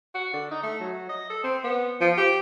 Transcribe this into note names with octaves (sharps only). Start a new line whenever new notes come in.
F#4
D3
D#4
A3
F#3
D#5
A4
C4
B3
F3
G4